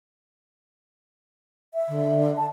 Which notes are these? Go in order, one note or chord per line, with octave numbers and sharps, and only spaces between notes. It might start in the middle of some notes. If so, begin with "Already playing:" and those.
E5
D3
A5